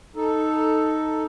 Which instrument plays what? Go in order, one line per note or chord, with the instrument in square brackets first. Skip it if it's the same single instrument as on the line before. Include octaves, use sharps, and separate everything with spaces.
[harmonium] D#4 A4